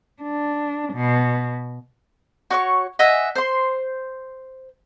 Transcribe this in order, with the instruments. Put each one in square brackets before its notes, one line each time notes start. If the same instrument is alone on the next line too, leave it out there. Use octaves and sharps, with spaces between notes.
[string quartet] D4
B2
[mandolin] F#4 C#5 C#6
D#5 E5 F#5 G#5
C5 C6